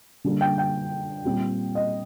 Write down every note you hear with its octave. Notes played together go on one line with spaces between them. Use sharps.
D3 G3 A#3
G5
G5
A#2 G3 C4
D#5